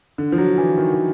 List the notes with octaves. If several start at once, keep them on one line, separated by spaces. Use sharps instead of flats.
D3
F3
F#3
E3
D#3
D#3